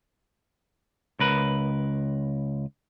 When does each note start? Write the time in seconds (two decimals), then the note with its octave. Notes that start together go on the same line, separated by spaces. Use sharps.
1.20 C#2 A#4 B4